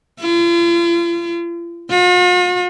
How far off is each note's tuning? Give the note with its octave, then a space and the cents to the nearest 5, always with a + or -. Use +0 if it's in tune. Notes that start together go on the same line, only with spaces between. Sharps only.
F4 -40
F4 +45